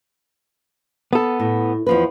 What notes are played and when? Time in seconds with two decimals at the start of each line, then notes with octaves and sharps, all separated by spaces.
1.13 B3 A4
1.40 A2
1.87 E2 F3 B4